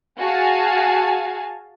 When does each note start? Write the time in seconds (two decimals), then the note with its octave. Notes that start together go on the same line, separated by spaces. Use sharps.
0.19 F#4 G#4 F5 G#5 A5